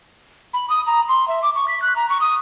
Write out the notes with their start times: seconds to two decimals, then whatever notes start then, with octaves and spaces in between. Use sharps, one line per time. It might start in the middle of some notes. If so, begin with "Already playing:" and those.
0.54 B5
0.70 D#6
0.87 A#5
1.09 C6
1.28 E5
1.43 D6
1.55 C#6
1.68 B6
1.82 F#6
1.96 A#5
2.10 C#6
2.21 D#6